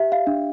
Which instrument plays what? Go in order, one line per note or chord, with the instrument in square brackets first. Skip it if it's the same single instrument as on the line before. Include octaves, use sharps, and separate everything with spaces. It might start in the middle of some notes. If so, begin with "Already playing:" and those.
Already playing: [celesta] G4 E5
F5
D4